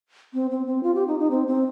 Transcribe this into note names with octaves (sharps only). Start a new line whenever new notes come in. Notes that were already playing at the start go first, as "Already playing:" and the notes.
C4
C4
C4
F4
G4
D#4
D#4
C4
C4